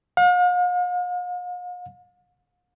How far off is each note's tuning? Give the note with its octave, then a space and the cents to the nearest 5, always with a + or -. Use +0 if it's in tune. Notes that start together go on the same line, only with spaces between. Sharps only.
F5 +45